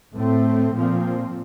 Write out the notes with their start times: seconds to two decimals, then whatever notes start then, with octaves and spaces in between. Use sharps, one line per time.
0.14 A2 A3 C4
0.75 A#2 F3 C4